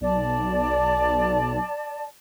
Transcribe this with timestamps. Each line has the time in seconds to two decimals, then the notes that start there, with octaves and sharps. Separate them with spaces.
0.01 B1 D5 A5